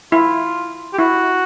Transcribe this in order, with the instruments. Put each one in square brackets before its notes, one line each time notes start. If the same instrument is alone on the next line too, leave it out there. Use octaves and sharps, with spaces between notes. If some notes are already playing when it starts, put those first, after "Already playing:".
[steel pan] E4 [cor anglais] F4
[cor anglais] G4
[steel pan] E4 [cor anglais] F#4